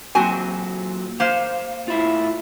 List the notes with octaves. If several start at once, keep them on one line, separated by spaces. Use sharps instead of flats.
A#2 F#3 C4 F#4 G#5
A#3 C5 F5
A2 E4 F4